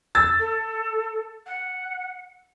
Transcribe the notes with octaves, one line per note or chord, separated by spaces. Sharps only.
E6 A6
A4
F#5